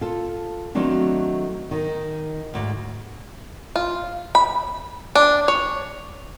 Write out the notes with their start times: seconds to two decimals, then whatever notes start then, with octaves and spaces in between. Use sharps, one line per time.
0.01 F4 A4
0.75 D#3 F#3 A3 C4 D4
1.71 D#3 D#4
2.54 D2 G#2
3.76 F4
4.35 B5
5.15 D4
5.48 C#5